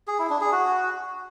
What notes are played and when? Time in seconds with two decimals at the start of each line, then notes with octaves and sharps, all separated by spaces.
0.08 G#4
0.19 E4
0.30 D4
0.41 G#4
0.52 F#4